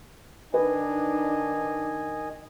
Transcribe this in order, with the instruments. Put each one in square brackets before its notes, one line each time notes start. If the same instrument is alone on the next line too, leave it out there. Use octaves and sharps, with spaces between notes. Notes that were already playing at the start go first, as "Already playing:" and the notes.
[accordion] D#3 D#5 G#5 [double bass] D4 D#4 [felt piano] B4